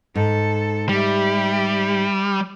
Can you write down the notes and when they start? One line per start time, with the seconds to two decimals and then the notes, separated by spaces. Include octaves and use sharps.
0.15 G#2 A4
0.89 G3 G4 E5